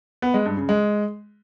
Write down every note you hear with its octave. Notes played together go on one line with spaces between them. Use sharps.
B3
G#3
G2
C#3
G#3